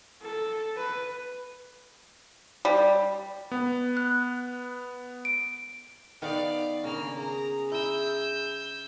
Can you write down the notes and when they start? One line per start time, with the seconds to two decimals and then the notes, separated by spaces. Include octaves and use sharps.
0.22 A4
0.77 B4
2.65 G3
3.51 B3
3.97 F#6
5.25 D7
6.22 D#3 B3 B4 D5 F5
6.84 A2 C#3 A#3 D4 G#5 F6
7.16 G#4 A#5
7.72 E4 E6 G6